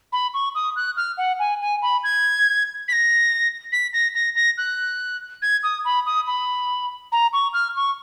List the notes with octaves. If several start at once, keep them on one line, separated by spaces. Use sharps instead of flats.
B5
C#6
D#6
F#6
F6
F#5
G#5
G#5
B5
G#6
B6
A#6
B6
A#6
A#6
A#6
F#6
G#6
D#6
B5
D#6
B5
A#5
C#6
F6
C#6